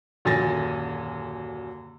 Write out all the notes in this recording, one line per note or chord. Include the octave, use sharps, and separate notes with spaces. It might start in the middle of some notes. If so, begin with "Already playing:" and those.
D#1 F#2 D3 G#5 A6 A#6